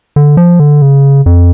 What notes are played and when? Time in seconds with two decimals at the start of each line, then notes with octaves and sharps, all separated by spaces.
0.16 D3
0.37 F3
0.60 D3
0.82 C#3
1.26 F2